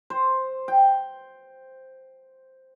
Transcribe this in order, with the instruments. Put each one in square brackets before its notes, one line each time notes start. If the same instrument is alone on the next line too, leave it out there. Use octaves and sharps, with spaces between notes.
[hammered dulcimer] C5
G5